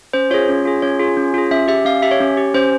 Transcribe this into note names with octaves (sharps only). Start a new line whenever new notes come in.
C#4 C5
F4 G#4 C#5
C#4
F4 G#4
C#4 C#5
F4 G#4
C#4
F4 G#4
C#4 E5
G4 E5
C#4 F5
G4 E5
C#5
C#4
G4
C#4 C5